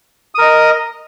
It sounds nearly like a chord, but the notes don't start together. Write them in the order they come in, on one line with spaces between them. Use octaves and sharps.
D#6 A#4 D#5